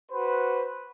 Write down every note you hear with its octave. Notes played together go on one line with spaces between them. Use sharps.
F#4 B4 C5